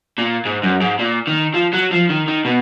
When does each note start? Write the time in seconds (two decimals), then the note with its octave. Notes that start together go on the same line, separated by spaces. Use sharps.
0.18 A#2
0.45 G#2
0.63 F#2
0.81 G#2
0.99 A#2
1.27 D#3
1.54 F3
1.73 F#3
1.91 F3
2.09 D#3
2.28 D#3
2.45 B2